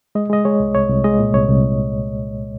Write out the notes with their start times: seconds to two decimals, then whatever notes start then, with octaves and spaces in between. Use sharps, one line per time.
0.15 G#3 D#5
0.30 G#3 D#5
0.45 G#3 C#5
0.60 C2
0.75 C2 C#5
0.89 C2
1.04 G#3 D#5
1.19 A#2
1.34 C2 C#5
1.49 C2